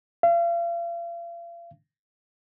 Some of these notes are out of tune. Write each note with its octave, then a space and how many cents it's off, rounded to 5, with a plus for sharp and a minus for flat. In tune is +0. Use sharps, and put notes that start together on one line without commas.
F5 -40